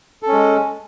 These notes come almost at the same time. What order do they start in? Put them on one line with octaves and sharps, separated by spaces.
A4 C#4 G#3